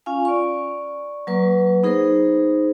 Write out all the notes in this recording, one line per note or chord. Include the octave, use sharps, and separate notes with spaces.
C#4 F4 F5 G#5
D5 C#6
F#3 A#3 B4
B3 D#4 G#4 A#4 C5